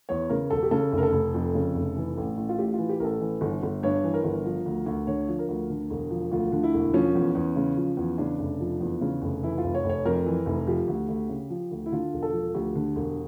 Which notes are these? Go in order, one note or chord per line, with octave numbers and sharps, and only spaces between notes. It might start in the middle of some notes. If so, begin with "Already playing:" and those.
E2 C#5
C#3 A#4
E1 A4
G4
C#3 A4
F1
A#4
A4
F1
F2
C#3
F1
E3
A1
A1
F4
A2 G4
E3 F4
G4
A1 A4 A#4
E3
G1
G1
G2 C#5
E3
A#4
G1
F3
D2
D2
D3 C#5
F3
A#4
D2
D3
E1
F3
D2 F4
D3
E4
E1
F3 C#4
E2
E2
C#3
F3
E2
C#3 D4
F1
F3
E2
C#3
F1
E3 E4
F4
F1
C#5
F1
C#5
F2 A#4
E3
F1
F3 G4
D2
D2
C#3
F3
D2
E4
D3 F4
E1
A4
F3
D2 G4
D3
E1